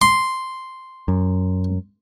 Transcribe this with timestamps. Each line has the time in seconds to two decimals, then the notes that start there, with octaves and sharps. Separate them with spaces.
0.02 C6
1.08 F#2